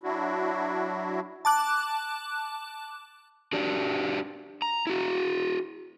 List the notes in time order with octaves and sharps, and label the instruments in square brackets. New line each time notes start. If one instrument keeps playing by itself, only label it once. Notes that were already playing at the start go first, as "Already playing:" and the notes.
[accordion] F#3 D4 E4 F#4
[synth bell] A5 D6 F#6
[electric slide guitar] D4 F#4 G4 D5
A#5
E4 F#4